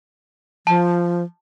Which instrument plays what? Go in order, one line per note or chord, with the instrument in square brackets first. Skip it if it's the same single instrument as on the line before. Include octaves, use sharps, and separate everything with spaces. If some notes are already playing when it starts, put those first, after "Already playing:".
[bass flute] F3 [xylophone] A5